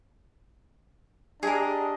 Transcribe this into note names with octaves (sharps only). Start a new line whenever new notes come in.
D4 G4 G#4 A#4 D#5